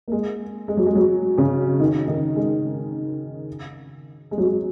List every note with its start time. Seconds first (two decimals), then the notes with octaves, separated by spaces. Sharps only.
0.08 A#3
0.12 G#3
0.68 G#3
0.77 F#3
0.86 G#3
0.95 F#3
1.37 C#3 C#4
1.79 D#3 D#4
2.07 D#3 D#4
2.36 G#3
4.31 G#3
4.38 F#3
4.45 G#3